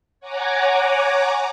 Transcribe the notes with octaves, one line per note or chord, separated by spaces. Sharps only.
C#5 F#5 G#5 A#5 D6